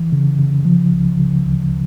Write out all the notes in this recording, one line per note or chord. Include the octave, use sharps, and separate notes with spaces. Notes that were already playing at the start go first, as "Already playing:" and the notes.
Already playing: E3
C#3
C#3
F3
C#2
C#3
D2